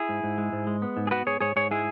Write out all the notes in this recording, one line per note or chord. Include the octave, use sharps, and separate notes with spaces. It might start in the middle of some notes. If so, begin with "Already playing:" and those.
Already playing: E4 G#4
G#2
G#2
G#3
G#2
G#3
B3
G#2
G#4
B3 F#4 B4
G#2 G#4 C#5
G#2 G#4 C#5
G#2 G#4 C#5
G#3 E4 G#4